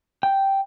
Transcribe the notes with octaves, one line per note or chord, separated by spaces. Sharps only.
G5